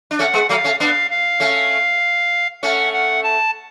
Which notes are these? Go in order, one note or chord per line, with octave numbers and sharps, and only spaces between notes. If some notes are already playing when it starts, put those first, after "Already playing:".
D4
A3 C#4 F#5
G#3 B3
F#3 A3 F5
A3 C#4
B3 D4 F5
F5
A3 C#4
A3 C#4 F#5
F#5
A5